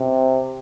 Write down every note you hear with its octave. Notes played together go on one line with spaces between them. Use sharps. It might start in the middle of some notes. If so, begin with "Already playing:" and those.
Already playing: C3